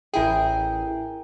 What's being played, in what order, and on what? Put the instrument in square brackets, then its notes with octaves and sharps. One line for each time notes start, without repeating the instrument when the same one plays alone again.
[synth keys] A1 E4 G#4 [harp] A#4 G5